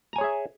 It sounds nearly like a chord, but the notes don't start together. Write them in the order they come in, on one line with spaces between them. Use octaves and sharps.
A#5 G#5 C#5 G#4 E5